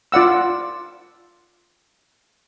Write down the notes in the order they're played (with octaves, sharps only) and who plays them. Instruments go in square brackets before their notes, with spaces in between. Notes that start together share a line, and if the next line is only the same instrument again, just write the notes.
[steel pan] F4 D5 F#5 E6